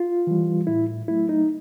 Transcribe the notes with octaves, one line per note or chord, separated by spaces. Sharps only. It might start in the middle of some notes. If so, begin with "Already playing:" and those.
Already playing: F4
E3 G3
A2 E4
F#3 A3 E4
D#4